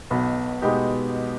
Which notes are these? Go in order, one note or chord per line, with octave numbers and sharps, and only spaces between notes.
B1 B2 B3
B2 G#3 B3 D#4 G4